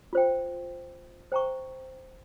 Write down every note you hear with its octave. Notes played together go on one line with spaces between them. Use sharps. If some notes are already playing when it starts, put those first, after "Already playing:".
F4 C5 G5
C5 G5 A#5 C#6